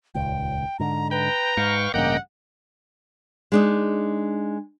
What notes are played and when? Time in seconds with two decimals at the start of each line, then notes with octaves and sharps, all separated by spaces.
0.15 D#1 C#2 G5
0.80 G#2 D3 A#5
1.11 B4 G5 A#5
1.57 G#2 F5 G5 C#6
1.94 A1 G2 C#3 A#3 D#5 F#5 G5 A#5
3.52 G#3 D4 D#4